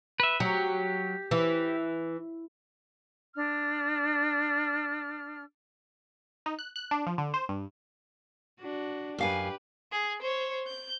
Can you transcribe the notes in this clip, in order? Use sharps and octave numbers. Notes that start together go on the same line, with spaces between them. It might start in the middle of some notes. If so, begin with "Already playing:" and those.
B4 E5
F#3 G4
E3
D4 F6
D#4
F#6
F#6
D4
F3
D3
C5
G2
D4 F#4
F#2 G4 B4 F5 G#5
G#4
C5 C#5
G6